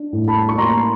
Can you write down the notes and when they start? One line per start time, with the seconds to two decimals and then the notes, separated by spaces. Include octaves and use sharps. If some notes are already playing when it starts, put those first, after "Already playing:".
Already playing: D4
0.13 A2
0.28 A5 B5
0.49 C#6
0.58 A#3 A#5 C6